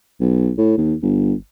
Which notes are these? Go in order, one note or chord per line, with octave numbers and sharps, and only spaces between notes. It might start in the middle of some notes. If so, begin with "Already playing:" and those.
B1
A2
D#2
G1